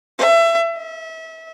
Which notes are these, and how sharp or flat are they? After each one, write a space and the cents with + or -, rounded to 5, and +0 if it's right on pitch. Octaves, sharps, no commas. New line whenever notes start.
E5 +25
E5 -30